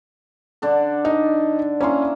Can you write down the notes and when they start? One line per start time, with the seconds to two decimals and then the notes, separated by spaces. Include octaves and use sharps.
0.62 D3 D4 A4
1.05 D#4
1.81 A#3 C#4 E4 C6